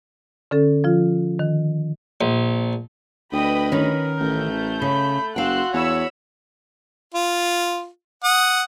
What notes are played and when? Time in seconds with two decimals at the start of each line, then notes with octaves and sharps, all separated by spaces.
0.51 D3 C#4 A4
0.84 F3 F4
1.39 D#3
2.21 A#1
3.32 D2 B4 D#5 G5 B5 D#6
3.72 D#3 C#4 A#4
4.20 A1 A3 G6
4.82 C#3 B5
5.36 F#1 F#4 F5 G5 C6 E6 F#6
5.73 E2 C#5 B5 E6
7.14 F4
8.24 F#5 D#6